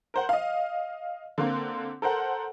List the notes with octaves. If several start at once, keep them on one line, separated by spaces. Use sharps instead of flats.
A#4 C5 F#5
D#5 F5
D3 A#3 C4
A4 A#4 C5 F#5